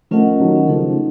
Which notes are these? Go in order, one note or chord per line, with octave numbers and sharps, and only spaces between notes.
F3 A3 C#4 F4 A#4 D#5 F#5
D#3 F#3
C#3 F3 A3 D#4 A4